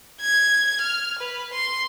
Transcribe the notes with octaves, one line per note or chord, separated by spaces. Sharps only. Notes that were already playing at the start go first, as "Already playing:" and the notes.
G#6
F6
B4
C6